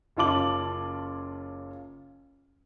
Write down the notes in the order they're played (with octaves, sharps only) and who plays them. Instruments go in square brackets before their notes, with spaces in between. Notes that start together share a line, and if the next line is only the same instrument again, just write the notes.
[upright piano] F#1 C#4 F4 A5 D6 F#7